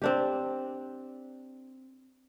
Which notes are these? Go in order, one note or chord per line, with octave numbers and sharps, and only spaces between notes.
C4 D4 G4